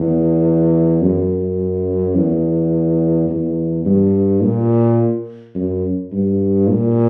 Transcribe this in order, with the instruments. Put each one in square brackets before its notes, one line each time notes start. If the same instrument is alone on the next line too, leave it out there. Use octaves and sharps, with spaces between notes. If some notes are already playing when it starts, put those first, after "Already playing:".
Already playing: [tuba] E2
F#2
E2
E2
G2
A#2
F#2
G2
A#2